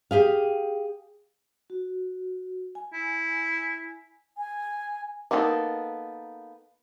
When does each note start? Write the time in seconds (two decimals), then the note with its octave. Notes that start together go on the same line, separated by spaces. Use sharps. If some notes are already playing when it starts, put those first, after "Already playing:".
0.11 G4 G#4 F5
1.70 F#4
2.75 G#5
2.94 E4
4.38 G#5
5.31 A#3 B3 D#4 G#4 A4